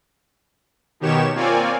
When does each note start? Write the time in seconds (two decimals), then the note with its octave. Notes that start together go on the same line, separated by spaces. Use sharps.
1.00 B2 D#3 G4 C#5 E7
1.34 A#3 C4 F4 C#5 D5 G#5